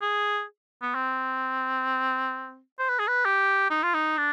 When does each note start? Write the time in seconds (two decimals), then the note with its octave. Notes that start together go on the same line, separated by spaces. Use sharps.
0.02 G#4
0.82 B3
0.95 C4
2.79 C5
2.89 B4
2.99 G#4
3.08 B4
3.25 G4
3.70 D#4
3.83 F4
3.94 D#4
4.18 D4